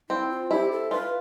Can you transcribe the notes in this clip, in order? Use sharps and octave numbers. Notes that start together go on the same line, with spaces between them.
C4 E4
F4
E4 G4
A4
F4 B4